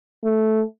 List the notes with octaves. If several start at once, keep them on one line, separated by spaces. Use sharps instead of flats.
A3